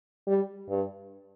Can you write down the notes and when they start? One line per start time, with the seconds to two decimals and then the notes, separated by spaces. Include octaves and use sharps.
0.27 G3
0.70 G2